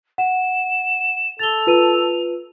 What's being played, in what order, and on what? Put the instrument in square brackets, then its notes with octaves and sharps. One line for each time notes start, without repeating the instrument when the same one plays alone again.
[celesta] F#5 [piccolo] E7
[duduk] A4 [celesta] A6 G7 [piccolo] F7
[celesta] F4 B4 D#7